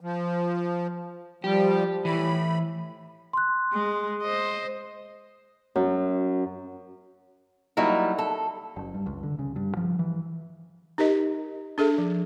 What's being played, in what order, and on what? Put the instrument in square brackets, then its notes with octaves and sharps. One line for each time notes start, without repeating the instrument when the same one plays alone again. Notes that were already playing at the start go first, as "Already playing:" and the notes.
[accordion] F3
[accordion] F3 G3 [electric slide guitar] G4
[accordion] A2 B5 [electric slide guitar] E3
[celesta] C6 F#6
[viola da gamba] G#3
C5 D#5
[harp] F#2
[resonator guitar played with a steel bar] F#3 G3 A#3 D#4 E4
A4
[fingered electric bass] F#1
G2
C#2
D3
C#3
G2
F3
E3
[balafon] D#4 G4 A#4 D#5
D4 G#4 A4 E5
F3